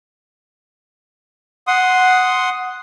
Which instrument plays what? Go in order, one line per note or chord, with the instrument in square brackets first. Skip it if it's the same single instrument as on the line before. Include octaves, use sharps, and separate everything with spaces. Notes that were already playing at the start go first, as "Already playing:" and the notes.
[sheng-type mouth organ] F#5 C6 D#6